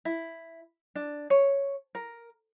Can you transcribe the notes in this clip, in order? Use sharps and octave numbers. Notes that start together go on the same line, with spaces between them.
E4
D4
C#5
A#4